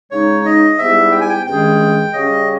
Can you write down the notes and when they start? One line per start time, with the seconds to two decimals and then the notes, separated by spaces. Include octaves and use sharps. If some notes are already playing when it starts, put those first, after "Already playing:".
0.11 C#3 G#3 D#4 C#5
0.45 D#5
0.78 G#2 G3 B3 E4 G4 E5
1.12 G5
1.21 G#5
1.29 G5
1.46 G2 D#3 G#3 C#4 G#4 G5
2.13 C#3 G3 C#4 G4 D#5